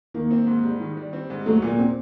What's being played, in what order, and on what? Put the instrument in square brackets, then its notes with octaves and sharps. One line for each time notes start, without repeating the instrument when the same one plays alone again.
[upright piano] D#3 [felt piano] A#3
[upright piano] C4
G#2
G3
D#3
G3
C4
G#2
[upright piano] F#3 [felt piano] A3
[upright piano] A#2 [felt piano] A#3
[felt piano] C4